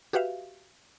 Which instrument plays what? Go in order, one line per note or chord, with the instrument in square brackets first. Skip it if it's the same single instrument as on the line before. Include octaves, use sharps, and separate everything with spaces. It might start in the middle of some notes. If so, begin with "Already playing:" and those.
[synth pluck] F#4 G4 B4 E5 F5